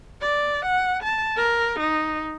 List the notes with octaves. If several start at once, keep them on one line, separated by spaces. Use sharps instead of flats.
D5
F#5
A5
A#4
D#4